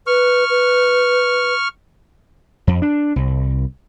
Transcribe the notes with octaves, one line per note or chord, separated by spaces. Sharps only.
B4 C#6 F6
B4
F2
D4
C2